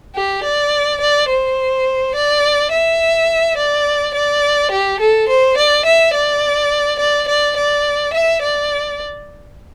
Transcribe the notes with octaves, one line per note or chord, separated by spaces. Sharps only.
G4
D5
D5
C5
D5
E5
D5
D5
G4
A4
C5
D5
E5
D5
D5
D5
D5
E5
D5